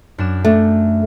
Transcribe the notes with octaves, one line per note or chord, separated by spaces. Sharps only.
F#2 D4 E7
A3 D4